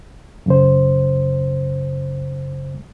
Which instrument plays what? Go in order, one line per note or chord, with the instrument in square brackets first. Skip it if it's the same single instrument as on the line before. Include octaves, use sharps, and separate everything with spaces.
[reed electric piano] F#2 C#3 C5